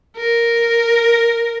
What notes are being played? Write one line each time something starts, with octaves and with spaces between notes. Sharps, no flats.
A#4